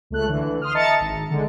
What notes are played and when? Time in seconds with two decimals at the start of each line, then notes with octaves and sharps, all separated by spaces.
0.10 C#2 A3 F#6
0.28 D3 E3
0.61 C6 D#6 F6
0.74 D#5 E5 A5 A#5 A6 C#7
1.00 G#1
1.31 D3 G#3